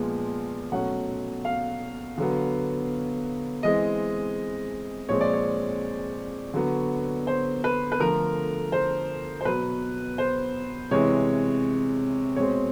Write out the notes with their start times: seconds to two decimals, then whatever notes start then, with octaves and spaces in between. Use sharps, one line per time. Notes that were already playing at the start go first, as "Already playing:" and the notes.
Already playing: A#2 F3 G#3 B3
0.72 B2 F#3 A3 C#4 F#5
1.45 F5
2.18 D3 F#3 B3
3.62 E3 G#3 C4 D#5
5.09 A#2 F3 G#3 C4 C#5
5.21 D5
5.33 C#5
6.54 D3 F#3 B3
7.27 C5
7.64 B4
7.92 B4
7.99 D3 F3 A3 A#4
8.72 C5
9.41 C5
9.45 B2 F#3 B3 B4
10.18 C5
10.91 C3 E3 G#3 C#5
12.36 B2 G#3 C4 C#5